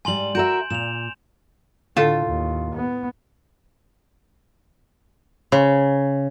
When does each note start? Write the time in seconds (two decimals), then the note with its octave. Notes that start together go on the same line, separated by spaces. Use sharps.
0.05 G#2 G3 G#5 C6 F#7
0.35 F#4 A#4 E5 G6 D7 E7
0.70 A#2 E7 F7
1.97 A2 D3 A3 F4 A5
2.27 D#2
2.76 B3
5.52 C#3